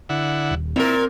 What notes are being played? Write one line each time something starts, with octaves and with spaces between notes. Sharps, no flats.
D3 E4 F#5
D#1
A#2 C4 E4 A#4